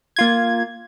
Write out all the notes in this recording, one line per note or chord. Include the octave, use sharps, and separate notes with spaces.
A#3 F4 G#6